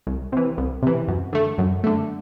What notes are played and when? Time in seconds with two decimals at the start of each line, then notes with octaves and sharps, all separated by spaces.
0.07 C2
0.32 C3 E3
0.58 C2
0.83 C3 E3
1.08 F#2
1.33 D3 A3
1.58 F#2
1.84 D3 A3